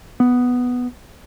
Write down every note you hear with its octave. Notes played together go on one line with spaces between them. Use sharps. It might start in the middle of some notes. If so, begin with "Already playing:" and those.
B3